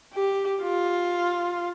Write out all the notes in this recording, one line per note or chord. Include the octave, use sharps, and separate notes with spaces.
G4
F4